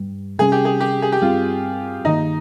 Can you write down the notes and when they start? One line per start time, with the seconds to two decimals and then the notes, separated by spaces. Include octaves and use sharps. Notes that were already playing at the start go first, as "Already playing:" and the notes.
Already playing: G2 G3
0.38 C3 G3 C#4 G#4
0.52 G4
0.65 G#4
0.80 G4
1.02 G#4
1.12 G4
1.22 G2 G3 C4 F4
2.04 G2 D#3 A#3 D#4